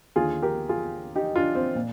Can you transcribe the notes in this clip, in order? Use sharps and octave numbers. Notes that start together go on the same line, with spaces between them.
D#2 D3 F4 G#4
G4 A#4
F4 G#4
D#4 G4
D4 F4
C4
A#2